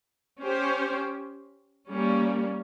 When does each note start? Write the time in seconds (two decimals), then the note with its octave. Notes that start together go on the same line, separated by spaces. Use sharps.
0.43 C#4 G4 C5
1.88 G3 A#3 C#4